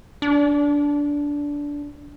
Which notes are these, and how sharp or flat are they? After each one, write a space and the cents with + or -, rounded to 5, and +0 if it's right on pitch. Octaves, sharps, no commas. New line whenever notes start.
D4 -15